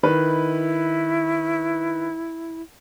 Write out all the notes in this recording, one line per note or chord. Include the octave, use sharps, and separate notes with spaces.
D#3 E4 B4